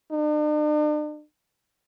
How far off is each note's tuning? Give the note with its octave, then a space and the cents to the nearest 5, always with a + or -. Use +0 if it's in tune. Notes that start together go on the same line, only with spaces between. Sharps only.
D4 +45